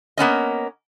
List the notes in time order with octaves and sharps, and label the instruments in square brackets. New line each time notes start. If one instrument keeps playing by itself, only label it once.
[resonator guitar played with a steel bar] A#3 B3 C#4 D#5